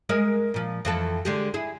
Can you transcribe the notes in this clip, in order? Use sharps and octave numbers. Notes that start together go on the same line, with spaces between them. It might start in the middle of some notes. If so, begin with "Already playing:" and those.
G#3 A#4 D#5
A#2 F3
F2 E3 A4
D3 G#3 G4
E4 G#4